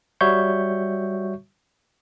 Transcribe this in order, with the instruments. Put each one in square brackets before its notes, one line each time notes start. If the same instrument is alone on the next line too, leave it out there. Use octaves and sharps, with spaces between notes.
[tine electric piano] G3 F#4 C#5 E5 C#6 G6